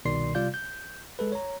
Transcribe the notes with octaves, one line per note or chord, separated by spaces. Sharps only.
C2 B2 D#3 D5 C6 C7
C3 G3 F4 D5 F5 G6
G6
G#3 A4 B4
C#5 A#5